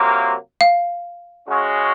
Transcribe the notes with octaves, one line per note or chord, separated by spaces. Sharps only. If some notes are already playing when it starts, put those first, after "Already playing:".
Already playing: C3 F#3 A#3 F4
F5
C#3 G#3 C#4 F#4